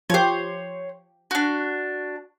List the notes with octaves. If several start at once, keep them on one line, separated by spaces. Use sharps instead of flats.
F3 G4 C5 C#5
D4 F#4